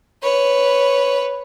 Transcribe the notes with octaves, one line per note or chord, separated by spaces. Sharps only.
B4 C#5